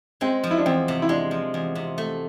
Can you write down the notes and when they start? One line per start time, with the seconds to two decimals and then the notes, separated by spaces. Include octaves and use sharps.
0.21 G#3 C4
0.44 F3
0.51 E4
0.58 D4
0.66 E2 C4
0.88 C3
1.02 E4
1.09 G#3 D4
1.31 F3
1.54 E2
1.75 C3
1.98 A3